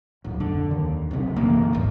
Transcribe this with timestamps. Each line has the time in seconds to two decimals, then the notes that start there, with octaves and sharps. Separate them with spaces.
0.24 D1 A#1 F#3
0.40 F2 D3
0.71 D#2
1.11 D#1 B1 C3 D#3 F4
1.36 F#2 D3 E3 A#3
1.73 G#1 E2